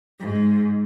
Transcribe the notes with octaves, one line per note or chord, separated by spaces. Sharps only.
G#2